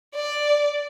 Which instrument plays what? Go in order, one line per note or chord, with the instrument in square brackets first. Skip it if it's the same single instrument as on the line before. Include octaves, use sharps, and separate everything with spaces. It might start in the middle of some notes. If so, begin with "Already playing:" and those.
[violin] D5